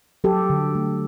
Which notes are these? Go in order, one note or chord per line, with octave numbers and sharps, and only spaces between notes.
F#3 G4 A4
D3
A3